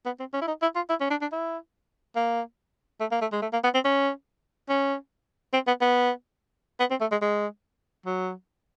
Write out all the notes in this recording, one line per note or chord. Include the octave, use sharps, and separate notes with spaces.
B3
C4
C#4
E4
D#4
E4
F4
E4
C#4
D4
D4
E4
A#3
A3
A#3
A3
G#3
A3
A#3
B3
C4
C#4
C#4
C4
B3
B3
B3
C4
A3
G#3
G#3
F#3